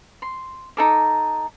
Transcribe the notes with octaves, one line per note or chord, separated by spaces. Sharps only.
C6
D#4 A4 D6